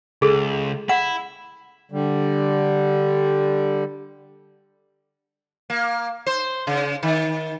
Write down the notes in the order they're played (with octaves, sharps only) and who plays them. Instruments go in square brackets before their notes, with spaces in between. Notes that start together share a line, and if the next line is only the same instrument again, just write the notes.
[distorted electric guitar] C#2 [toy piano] G#4 A4
[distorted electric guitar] E4 [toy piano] F#5
[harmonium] D3 G3
[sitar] A#3
C5
C#3
D#3